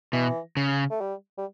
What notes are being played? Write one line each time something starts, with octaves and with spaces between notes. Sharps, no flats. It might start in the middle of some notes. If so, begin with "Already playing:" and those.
B2 E3
C#3
A3
G3
G3